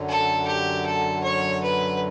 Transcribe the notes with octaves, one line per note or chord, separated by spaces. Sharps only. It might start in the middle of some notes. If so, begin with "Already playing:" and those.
Already playing: F#2 D3 F#3
A4
G4
A4
C#5
B4